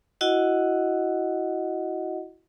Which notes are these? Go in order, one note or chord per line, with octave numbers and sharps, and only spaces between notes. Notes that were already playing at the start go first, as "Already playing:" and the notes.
E4 F#4 D#5 F#5